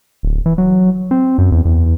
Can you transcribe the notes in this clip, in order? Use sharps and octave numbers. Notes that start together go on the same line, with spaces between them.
D1
E3
F#3
C4
F#2
E2
E2